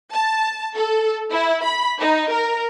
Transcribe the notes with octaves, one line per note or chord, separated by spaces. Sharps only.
A5
A4
E4
B5
D#4
A#4